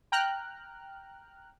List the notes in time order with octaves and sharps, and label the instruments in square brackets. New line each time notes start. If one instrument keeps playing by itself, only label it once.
[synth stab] G5 A#5 F6 F#6